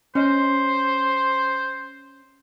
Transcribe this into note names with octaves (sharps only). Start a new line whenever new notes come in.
C#4 C5 D#5